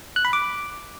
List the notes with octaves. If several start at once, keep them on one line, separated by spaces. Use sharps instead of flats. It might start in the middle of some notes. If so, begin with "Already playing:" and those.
F#6
B5
D6